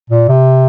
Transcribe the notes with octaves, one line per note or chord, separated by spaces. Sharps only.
A#2
C3